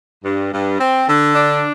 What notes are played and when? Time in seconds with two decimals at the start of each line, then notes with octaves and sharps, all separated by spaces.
0.24 G2
0.52 G2
0.79 C4
1.07 D3
1.34 D4